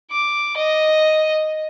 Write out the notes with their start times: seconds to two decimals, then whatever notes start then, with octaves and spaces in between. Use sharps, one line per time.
0.11 D6
0.57 D#5